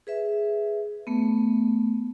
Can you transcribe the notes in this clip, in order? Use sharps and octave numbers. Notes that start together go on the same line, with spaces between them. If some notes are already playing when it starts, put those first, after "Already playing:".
G#4 B4 E5
A3 B3